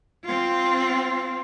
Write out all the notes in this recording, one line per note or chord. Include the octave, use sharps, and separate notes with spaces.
C4 F4